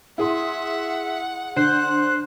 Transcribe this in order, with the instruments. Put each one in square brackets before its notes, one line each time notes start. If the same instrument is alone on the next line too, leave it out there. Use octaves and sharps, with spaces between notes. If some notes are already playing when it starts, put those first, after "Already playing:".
[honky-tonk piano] E4 G#4 C6 [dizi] E5 [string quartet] F#5
[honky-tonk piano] D3 [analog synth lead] C5 [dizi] F#6